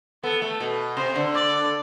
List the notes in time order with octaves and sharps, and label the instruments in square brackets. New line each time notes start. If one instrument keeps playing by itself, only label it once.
[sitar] B3 [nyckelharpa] A4
[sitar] A3
B2
[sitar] C3 [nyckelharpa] C5
[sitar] D3
[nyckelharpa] D5